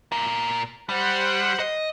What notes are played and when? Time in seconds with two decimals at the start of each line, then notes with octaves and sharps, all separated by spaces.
0.12 A#2 A#4
0.89 G3 C5 F#5
1.60 D#5